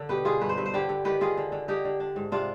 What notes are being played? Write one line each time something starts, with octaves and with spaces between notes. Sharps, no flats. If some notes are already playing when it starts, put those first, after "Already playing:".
Already playing: D3
B2 G4 B4
B2 F4 G#4
G2 B4
C5
G2 B4
C5
D3 G4 B4
D3
D#3 G4 B4
D#3 F4 G#4
D3
D3
D3 D#4 G4
D3
D4
G#2
C3 D4 F4